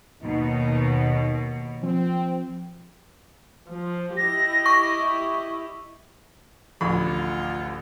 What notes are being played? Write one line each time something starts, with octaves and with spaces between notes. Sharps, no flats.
D#2 B2 D#4
F3 C4
F3
E4 G4 D#5 A#6
C#6
E5
A1 D2 F3 F4 B5